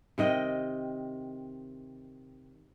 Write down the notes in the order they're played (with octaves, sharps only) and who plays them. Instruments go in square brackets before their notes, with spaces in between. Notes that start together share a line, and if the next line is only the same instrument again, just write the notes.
[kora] C3 D#3 D#5 G5